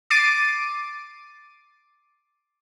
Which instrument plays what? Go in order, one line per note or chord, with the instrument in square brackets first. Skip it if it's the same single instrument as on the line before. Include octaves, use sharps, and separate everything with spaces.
[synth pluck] D6 A6 C7 D7 D#7